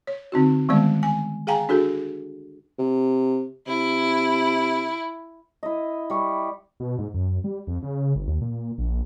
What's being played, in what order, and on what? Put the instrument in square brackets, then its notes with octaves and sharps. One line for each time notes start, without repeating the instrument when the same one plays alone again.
[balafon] C#5
D3 C4 D#4 F#4
D#3 G3 G#3 B3 D5
G#5
G#4 F5 G5 G#5 A#5
D4 F#4 G#4 A4
[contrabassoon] C3
[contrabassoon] C3 [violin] E4
[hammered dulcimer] E4 D#5
G3 C#6
[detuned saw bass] B2
G#2
F#2
G3
F2
C#3
G1
D#2
A#2
A#1